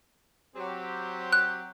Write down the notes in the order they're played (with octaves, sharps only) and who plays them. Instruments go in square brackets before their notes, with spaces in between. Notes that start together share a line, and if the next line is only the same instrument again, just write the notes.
[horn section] F#3 C4 G4
[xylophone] F#6